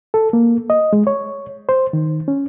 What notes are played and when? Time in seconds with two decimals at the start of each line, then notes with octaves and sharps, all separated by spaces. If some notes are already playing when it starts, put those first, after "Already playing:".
0.14 A4
0.33 A#3
0.70 D#5
0.93 G#3
1.07 C#5
1.69 C5
1.93 D#3
2.28 C#4